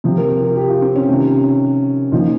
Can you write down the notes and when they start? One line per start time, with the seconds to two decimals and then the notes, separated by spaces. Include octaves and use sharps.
0.04 C3 F3
0.17 A#4
0.30 A#4
0.43 A#4
0.56 G4
0.69 F4
0.82 C4
0.96 C#4
1.08 C3 D#3
2.12 A#2 F3 D#4